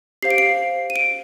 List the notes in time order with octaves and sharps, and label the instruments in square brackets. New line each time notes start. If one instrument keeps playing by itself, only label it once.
[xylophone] G4 C5 F5 C7
D7
C7
D#7
D7